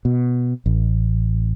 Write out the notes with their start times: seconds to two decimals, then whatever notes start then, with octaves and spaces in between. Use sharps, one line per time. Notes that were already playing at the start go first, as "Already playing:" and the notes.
0.05 B2
0.66 A1